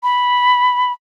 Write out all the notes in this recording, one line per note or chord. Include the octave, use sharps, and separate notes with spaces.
B5